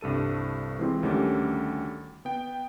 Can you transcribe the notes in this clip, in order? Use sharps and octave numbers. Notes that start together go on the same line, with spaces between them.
C2 G2 A4 D#7
E3 G#3 C4 F4
D2 D#3 G3 C#4 A4 D6
B3 G5